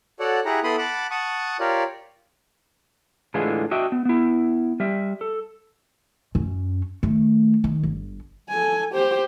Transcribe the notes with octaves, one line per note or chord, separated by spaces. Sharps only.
F#4 A4 C#5 D5 F#5
E4 G4 G#4 F#5 A#5
B3 E4 A4 B5 C6 D#6
F#5 A5 B5 D6
F#5 A5 C#6 D#6
F4 G4 A#4 C#5 D5
A2 D3 E3 G#3 F4 G#4
D4 F#4 D#5 E5 G5
B3
B3 E4
G3 E5
A4
F#2 C#4
D#3 A3
D#3
G1
A4 G#5
G4 C5